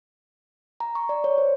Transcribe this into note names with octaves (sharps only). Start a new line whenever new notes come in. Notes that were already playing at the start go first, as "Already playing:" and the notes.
A#5
C#6
D5
C#5
C5